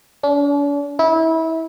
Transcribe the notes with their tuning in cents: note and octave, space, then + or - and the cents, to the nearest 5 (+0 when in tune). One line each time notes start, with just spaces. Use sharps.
D4 -45
E4 -25